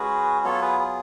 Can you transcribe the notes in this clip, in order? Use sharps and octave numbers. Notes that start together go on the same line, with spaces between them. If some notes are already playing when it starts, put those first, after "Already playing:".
Already playing: G#3 C#4 F#4 G#4 B4
F#3 B3 F4 A4 C#5
G#4 B4
G#4